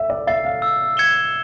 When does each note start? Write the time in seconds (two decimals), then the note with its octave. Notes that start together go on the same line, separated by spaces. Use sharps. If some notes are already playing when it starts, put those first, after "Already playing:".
Already playing: E5
0.10 D5
0.27 E5 A6 C7
0.45 F5
0.62 E6
0.97 G#6 C#7 E7 G7